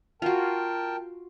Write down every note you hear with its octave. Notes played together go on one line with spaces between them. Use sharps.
F4 F#4 A#4 G5 A5